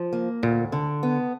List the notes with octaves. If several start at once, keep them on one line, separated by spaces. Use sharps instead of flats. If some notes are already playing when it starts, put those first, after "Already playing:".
Already playing: F3
A#3
D2 A#2
D3
B3